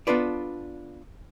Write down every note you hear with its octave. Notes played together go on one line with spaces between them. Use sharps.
B3 D4 F4 A4 B4 D5